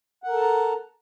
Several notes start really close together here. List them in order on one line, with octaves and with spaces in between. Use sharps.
F#5 A#4 A4 A5 A#5